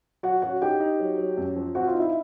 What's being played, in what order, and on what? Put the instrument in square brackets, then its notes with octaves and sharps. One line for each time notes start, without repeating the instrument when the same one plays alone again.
[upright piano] F#3 [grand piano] F#4 F#5
[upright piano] C#4 [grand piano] F#4 F#5
[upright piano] D#4 [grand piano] G4 G5
[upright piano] D#4
F#3
F#3
F#2
F3
[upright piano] C4 [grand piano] F#4 F#5
[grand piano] F4 F5
[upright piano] D#4
[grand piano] E4 E5